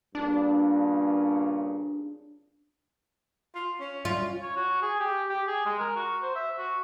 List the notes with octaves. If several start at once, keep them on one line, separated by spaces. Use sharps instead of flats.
G2 A#2 C#3 D4
F4
C#4
C#4 F4
C#5
F#4
G#4
G4
G4
G#4
G#3
A#4
F#4
C5
E5
F#4